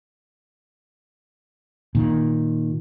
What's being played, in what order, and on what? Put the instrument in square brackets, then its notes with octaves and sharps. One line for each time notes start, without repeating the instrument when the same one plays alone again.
[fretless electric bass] A#2 D#3